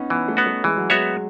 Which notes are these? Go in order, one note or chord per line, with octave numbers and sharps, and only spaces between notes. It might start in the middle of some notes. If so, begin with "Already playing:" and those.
Already playing: B3 C#4 D#4
E3 B3
A3
B3 F#4
A3
E3 G#3
F#3
G#3 B3 F#4 C#5 E5